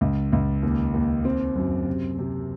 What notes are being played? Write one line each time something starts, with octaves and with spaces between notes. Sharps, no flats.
C#2
C#2
D#2
D#2
C4
F#2
C3
C3